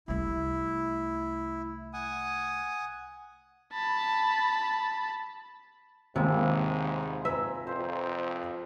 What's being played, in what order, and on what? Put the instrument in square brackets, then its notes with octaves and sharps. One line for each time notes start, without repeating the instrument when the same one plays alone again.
[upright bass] C2 A3 [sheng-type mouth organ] E4
[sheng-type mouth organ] F#5 G#5 D#6
[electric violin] A5 B5
[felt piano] D#2 G#3 [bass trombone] G#2 [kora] C3 [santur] F3 G3
[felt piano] B4 G#5 A#5 [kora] E5
[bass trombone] F2 [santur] C5